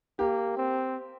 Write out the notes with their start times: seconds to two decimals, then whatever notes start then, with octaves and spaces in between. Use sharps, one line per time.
0.19 A#3 G4
0.57 C4